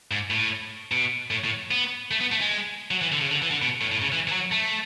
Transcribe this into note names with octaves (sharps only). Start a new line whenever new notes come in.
G#2
A2
B2
A2
A2
B3
A3
B3
A3
G#3
F#3
E3
D3
C#3
D3
E3
D3
B2
A2
A2
C#3
E3
E3
F#3
A3